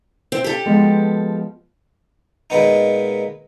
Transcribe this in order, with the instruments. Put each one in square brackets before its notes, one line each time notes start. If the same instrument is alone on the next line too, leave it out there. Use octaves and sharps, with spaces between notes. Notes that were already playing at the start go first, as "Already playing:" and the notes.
[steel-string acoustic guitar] C4
G4 A4
[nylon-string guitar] F3 G#3 B3
[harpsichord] A#2 G#3 B3 D#4